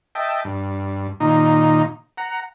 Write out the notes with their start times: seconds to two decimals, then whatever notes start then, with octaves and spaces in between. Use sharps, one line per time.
0.15 D#5 E5 G5 A5
0.44 G2
1.20 A#2 D#3 D#4
2.18 F#5 A#5